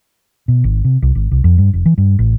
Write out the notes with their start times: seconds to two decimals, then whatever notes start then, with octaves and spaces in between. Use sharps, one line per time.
0.48 B2
0.64 G#1
0.84 C3
1.02 C2
1.15 G#1
1.31 C2
1.44 F2
1.58 G2
1.74 F1
1.86 E3
1.98 G2
2.19 A1